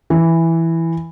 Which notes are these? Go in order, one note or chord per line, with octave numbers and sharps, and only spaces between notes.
E3